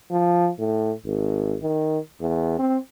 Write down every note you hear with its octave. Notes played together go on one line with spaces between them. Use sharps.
F3
A2
G#1
D#3
E2
C4